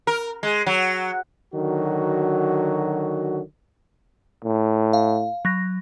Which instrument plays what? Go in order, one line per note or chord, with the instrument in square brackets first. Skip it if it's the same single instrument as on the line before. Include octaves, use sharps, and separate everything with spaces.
[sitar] A#4
G#3
F#3
[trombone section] D3 D#3 F#3 F#4
[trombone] A2
[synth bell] F5
F#3 A#6